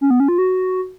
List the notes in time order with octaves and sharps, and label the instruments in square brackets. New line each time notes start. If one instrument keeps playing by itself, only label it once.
[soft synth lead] C#4
B3
C#4
F4
F#4